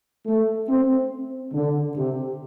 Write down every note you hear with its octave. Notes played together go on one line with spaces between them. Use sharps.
A3
C4
D3
C3